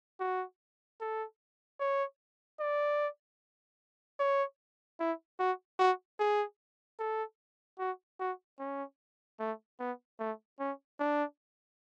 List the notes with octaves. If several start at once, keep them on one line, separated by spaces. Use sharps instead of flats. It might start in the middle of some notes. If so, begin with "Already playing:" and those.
F#4
A4
C#5
D5
C#5
E4
F#4
F#4
G#4
A4
F#4
F#4
C#4
A3
B3
A3
C#4
D4